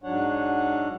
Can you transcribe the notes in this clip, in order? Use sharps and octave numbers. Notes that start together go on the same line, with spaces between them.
G#2 F#3 D4 C#5 F#5